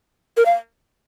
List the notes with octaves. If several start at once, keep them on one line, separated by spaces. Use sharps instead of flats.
A#4
F5